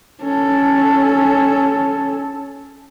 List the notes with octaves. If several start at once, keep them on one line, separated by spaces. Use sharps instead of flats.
C#4 A4